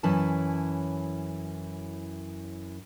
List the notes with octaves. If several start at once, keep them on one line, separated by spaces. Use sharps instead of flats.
F#2 E3 C#4 E4 A5